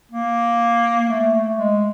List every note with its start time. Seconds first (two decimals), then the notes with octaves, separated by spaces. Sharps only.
0.12 A#3
1.09 A3
1.35 A3
1.59 G#3